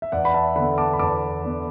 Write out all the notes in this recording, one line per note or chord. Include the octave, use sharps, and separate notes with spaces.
E5
E2 D5 F#5
B5
E5 A5
D3 B3 F#5 B5
A5 D6
B5
E2 A5 D6
D3 B3